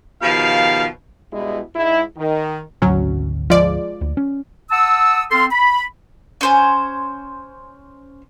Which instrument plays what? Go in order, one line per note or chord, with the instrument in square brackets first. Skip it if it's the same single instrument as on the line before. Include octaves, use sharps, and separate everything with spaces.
[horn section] B2 D#3 F3 G4 F5
[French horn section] G2 B2 G#3 E4
G#2 E4
D#3
[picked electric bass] G#1 D2 [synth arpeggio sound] F#3 C#4
[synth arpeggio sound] F3 G#3 D5
[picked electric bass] D2
C#4
[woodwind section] F#5 A5 D#6 E6
C4 A4 F5 C6
B5
[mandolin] C#4 C5 G#5